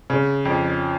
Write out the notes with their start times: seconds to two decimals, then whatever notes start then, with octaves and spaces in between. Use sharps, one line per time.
0.10 C#3
0.45 F2